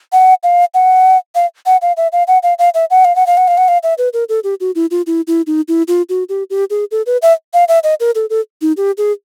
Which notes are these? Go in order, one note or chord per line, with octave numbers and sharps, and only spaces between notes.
F#5
F5
F#5
F5
F#5
F5
E5
F5
F#5
F5
F5
E5
F#5
F5
F#5
F5
F#5
F5
F#5
F5
E5
B4
A#4
A4
G4
F#4
E4
F4
E4
E4
D#4
E4
F4
F#4
G4
G4
G#4
A4
B4
E5
F5
E5
D#5
A#4
A4
A4
D#4
G4
G#4